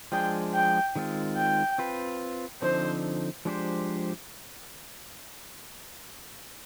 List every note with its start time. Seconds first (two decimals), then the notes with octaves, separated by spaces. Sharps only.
0.12 F3 G#3 D4 G#4 G5
0.54 G5
0.95 D#3 G#3 C4 F4
1.36 G5
1.78 C4 F4 B4
2.61 D3 F3 C4 D#4 C5
3.45 F3 G#3 D4 G4 C5